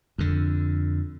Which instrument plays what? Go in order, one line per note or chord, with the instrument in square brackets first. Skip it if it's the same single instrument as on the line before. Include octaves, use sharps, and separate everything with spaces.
[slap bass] F2 D3